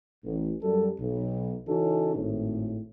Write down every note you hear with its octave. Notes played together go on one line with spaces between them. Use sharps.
A1
F#2 G3 A4
B1
C#3 E3 C#4 D#4 F#4 A4
G#1 A2